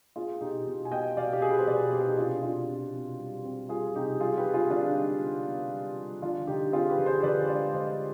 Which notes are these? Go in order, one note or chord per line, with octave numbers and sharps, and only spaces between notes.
B3 F4 G#4
B2 D#4 G4
B2
G#5
B3 D#5 G5
B2 D5 F5
G4
B3 G#4
B4
C5
B2 B4 D5
B2 G4
G#4
D#4 G4
C3 D4 F4
C3 D4 F4
C3
C3
G3
C4
G3 F4 G#4
C3 D#4 G4
G3 F4 G#4
G4 B4
G3
F4 G#4
D3 D4 F4
D#4
G3
B3
B3
G3
G3
D3 D4 F4
D3 D#4 G4
C4 F4 G#4
G4 B4
D3
G#4 C5
D3 B4 D5
G#3 B4 D5
D3 C5 D#5